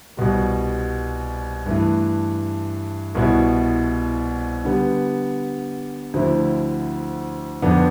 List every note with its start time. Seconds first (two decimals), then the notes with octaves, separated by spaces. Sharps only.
0.17 C2 B2 G3
1.66 G2 E3 A3
3.15 C2 B2 B3 E4
4.64 D3 G3 B3
6.14 D2 D3 F3 C4 E4
7.62 F2 D3 F3 B3 D4